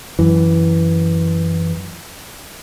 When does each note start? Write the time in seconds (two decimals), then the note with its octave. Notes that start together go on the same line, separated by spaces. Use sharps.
0.19 F#2 E3